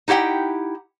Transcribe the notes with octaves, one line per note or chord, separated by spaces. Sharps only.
D#4 E4 G4 F#5 G5